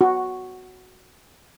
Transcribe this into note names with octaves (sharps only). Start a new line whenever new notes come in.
F#4